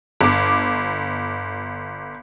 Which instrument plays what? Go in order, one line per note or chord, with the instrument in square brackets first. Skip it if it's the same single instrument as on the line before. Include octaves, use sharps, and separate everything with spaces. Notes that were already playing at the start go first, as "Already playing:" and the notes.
[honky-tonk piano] G1 D6